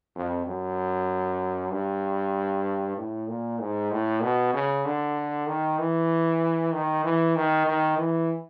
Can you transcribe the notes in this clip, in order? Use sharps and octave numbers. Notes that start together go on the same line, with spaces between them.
F2
F#2
G2
A2
A#2
G#2
A2
B2
C#3
D3
D#3
E3
D#3
E3
D#3
D#3
E3